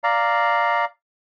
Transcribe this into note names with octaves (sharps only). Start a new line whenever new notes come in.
D5 F5 A#5